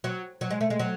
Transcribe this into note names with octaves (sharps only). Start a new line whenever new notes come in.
F#3
F#3
G#3
A3
G#3
F#3